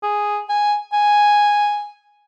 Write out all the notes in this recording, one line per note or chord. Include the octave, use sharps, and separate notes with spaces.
G#4
G#5
G#5